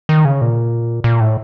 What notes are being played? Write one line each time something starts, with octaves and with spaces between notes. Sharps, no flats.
D#3
C#3
A#2
A#2
A2